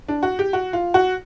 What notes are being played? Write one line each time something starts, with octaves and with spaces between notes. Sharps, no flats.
D4
F#4
G4
F#4
F4
F#4